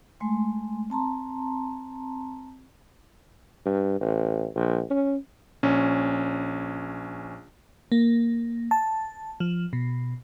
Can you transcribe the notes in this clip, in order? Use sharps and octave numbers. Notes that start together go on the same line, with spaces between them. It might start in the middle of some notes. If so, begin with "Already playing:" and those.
G#3 A3 G#5 C6
C4 A5 A#5 C6
G2
A1
A#1
C#4
A#1 C#4
A#3
A5
F3
B2